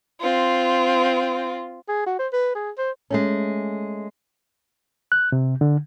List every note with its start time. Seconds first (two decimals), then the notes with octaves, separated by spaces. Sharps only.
0.21 C4 F4
1.88 G#4
2.06 F#4
2.19 C5
2.33 B4
2.55 G#4
2.78 C5
3.10 G#3 A3 C#4
5.12 F#6
5.32 C3
5.61 D3